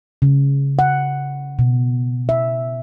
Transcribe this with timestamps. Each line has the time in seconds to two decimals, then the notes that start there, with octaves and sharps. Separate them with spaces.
0.22 C#3
0.79 F#5
1.59 B2
2.29 E5